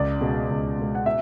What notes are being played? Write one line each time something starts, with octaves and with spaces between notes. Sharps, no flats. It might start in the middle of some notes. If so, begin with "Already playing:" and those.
Already playing: C#2 D5
B2 G#3
C#2
B2 G#3
F#5
B2 E5